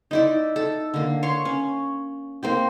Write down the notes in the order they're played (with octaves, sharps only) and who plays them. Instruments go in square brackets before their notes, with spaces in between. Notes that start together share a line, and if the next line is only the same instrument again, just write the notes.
[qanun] D#4 E4 D5
A4
D3 A#3
C#5 C6 C#6
C#4
A#3 C4 G4